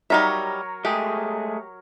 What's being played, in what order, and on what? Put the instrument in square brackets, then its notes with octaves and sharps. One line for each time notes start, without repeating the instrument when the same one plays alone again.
[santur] F#3 A#4 C#5 [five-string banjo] G3 D#4 E5
[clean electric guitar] G#3 A3 G#4 [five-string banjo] G4